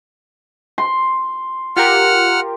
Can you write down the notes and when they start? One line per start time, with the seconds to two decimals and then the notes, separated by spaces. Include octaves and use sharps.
0.78 C6
1.76 F4 G4 A#4 F#5 F6